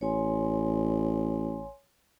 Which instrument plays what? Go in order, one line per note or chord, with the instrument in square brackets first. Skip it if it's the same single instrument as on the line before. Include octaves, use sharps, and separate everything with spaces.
[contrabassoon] A1 [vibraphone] C#5 G#5 C6